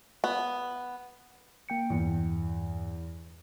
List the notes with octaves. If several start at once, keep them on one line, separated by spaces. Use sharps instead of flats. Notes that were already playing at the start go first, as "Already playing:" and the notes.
B3
A#3 G5 C#7
E2 G2